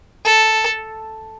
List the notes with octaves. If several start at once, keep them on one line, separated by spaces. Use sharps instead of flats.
A4